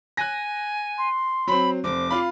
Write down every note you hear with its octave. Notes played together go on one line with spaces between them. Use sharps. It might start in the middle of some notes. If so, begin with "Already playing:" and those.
G#5 F#6 A#6
C6
F#3 C4 B5
F1 C5 D6
F4 F5 B5